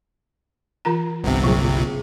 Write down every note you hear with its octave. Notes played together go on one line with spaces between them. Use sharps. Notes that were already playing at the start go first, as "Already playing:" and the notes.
E3 F4 A#5
G1 C2 C3 B3
A#2 C#3 F#3 G#4